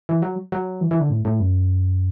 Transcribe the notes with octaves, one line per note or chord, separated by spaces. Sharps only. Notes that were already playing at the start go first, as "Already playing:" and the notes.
E3
F#3
F#3
E3
E3
D3
A2
A2
F#2